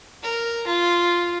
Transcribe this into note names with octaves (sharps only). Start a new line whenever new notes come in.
A#4
F4